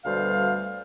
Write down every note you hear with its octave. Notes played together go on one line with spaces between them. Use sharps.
D2 B2 G3 A4 C5 F5